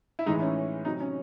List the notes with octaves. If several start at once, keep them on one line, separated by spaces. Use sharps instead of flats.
E4
A2 E3 G#3 D#4
C#4
C3 F#3 D#4
C#4